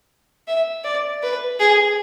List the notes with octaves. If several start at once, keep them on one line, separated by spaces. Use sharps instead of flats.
E5
D5
B4
G#4